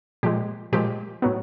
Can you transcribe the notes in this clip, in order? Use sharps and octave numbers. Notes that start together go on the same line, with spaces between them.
A#2 F3 G#3 G4
A#2 F3 G#3 G4
A2 F#3 B3